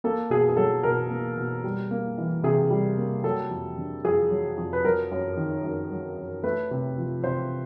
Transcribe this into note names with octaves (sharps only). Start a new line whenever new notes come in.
A#3 A4
B2 G#4
G#4
F#3 A4
B2 A#4
A#3
B2
G3
A#3
E3
C3 G#4
G3
A#3
F#3 A4
F2
D3
F2 G#4
F#3
F2
B4
F#3 A#4
F#2
D#3
F#2
F#3
F#2
A3 B4
C3
F3
C3 C5